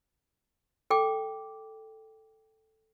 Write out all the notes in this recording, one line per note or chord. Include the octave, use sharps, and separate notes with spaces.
A4 G5 D6